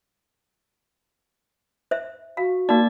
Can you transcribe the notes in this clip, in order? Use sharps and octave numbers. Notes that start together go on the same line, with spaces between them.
C5 E5
F#4 F5
A#3 D#4 D5